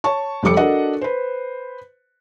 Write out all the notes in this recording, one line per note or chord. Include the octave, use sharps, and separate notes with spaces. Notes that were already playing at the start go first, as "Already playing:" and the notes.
C#5 A5 C#6
F1 G3 G4 A4 D6 C#7
D4 F#4 A4 A#4 D#5 F#5
B4 C5